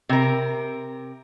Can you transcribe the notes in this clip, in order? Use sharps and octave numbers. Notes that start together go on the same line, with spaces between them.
C3 A#4